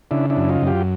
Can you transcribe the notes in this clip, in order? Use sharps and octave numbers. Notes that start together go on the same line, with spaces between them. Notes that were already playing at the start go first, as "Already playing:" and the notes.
C#3 D4 E4
D4 E4
F#2
D#4 F4
F#2
F4 G4